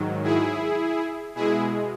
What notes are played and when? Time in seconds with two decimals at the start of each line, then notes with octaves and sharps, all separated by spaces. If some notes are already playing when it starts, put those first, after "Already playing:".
Already playing: G#2 D#3 F#3
0.24 E4 G#4
1.35 B2 G#3 E4 G#4